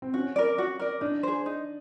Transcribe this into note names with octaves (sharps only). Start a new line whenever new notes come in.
C4
C#4 F#4
A#4 D5
F#4
A#4 D5
D4 D#4
G#4 C5
D#4